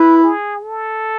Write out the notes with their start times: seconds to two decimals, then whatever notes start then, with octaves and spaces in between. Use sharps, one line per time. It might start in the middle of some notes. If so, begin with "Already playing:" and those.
Already playing: E4 B4
0.23 G#4
0.63 A4